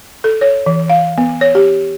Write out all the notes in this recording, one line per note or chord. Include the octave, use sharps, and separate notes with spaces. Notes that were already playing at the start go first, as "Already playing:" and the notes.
A4
C#5
E3
F5
B3
C#5
G4